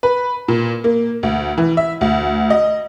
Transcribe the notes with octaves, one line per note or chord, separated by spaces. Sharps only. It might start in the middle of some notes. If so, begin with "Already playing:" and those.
B4
A#2
A#3
D2
E3
E5
D2
D#5